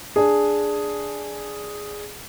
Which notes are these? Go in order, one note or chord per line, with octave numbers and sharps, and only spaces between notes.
D4 G#4